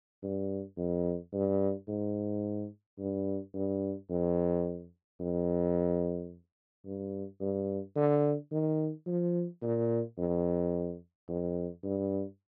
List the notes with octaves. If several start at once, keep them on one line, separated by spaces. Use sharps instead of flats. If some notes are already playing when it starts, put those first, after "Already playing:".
G2
F2
G2
G#2
G2
G2
F2
F2
G2
G2
D3
D#3
F3
A#2
F2
F2
G2